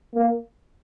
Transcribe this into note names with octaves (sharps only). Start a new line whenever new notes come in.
A#3